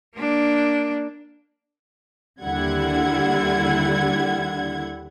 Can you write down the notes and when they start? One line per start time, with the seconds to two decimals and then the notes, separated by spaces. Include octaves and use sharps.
0.17 A#3 D4
2.43 D#2 D3 G3 E4 F#5 G#6